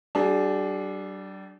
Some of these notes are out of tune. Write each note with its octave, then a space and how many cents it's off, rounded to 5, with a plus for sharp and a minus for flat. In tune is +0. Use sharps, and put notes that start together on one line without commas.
G3 -40 D4 +0 G#4 +30